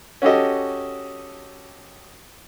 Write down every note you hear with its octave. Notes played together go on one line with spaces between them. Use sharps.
C#4 F#4 G4 A4 D#5